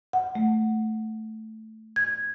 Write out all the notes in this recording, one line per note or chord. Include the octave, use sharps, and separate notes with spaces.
F#5
A3
G#6